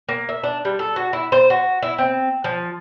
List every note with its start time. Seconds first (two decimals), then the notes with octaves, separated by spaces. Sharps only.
0.09 A#3
0.29 E5
0.44 D4
0.65 G3
0.79 A4
0.96 F#4
1.13 E4
1.32 C5
1.50 F#4
1.82 E4
1.98 C4
2.44 F3